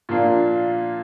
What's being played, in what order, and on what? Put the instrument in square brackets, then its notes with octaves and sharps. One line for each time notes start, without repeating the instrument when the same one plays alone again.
[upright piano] A#2 F3 A#3 D4 F4